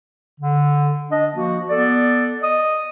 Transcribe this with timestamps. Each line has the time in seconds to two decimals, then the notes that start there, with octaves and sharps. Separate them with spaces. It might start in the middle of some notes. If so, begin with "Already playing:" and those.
0.40 D3
1.11 D4 D#5
1.35 F3 A#3 F#4
1.70 B3 A4 D5
2.42 D#5 D#6